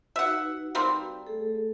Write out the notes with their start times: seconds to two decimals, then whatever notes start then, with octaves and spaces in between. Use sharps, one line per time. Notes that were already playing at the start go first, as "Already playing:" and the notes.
0.16 D#4 F#4 B4 E5 F#5
0.75 G3 A#3 C4
1.27 A3 G#4 A4